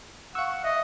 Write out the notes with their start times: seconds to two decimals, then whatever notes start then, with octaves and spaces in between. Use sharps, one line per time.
0.35 F5 F#5 C#6 E6
0.64 D#5 E5